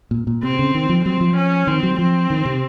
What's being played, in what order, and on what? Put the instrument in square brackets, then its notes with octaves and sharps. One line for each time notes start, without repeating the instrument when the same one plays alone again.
[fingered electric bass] A#2
A#2
[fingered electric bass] C3 [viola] C4
[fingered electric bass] C#3
D#3
F3
[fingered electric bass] F#3 [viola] C4
[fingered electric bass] F3
[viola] C#4
[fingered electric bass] D#3 [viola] C4
[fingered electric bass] F#3
[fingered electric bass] F3 [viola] C4
[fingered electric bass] D#3
C3